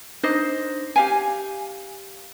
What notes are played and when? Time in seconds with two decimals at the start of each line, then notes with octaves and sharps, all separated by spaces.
0.23 D4 D#4 C5 D#5
0.96 G4 F5 G#5